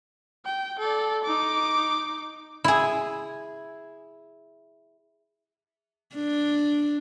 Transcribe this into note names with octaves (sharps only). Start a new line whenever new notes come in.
G5
A4 D5
D#4 D6
E4 G#4
D4